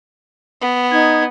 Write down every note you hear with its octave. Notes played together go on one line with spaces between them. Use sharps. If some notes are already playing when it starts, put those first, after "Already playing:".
B3
D#4 G#6